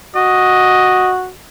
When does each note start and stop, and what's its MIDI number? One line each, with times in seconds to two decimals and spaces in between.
0.16 1.29 66
0.16 1.12 75